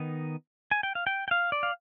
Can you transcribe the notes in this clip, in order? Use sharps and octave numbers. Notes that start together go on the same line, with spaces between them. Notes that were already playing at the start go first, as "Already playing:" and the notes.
Already playing: D#3 B3 D#4
G#5
G5
F5
G5
G5
F5
D5
F5